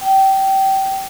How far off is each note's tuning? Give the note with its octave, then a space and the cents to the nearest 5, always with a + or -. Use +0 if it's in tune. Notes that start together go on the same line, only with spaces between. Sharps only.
G5 -20